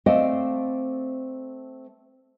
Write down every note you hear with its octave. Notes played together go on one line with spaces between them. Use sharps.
A3 C4 C5 D5 D#5 F5